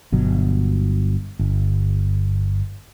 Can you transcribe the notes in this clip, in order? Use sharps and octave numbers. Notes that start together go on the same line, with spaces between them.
G1 B2 F#3
G1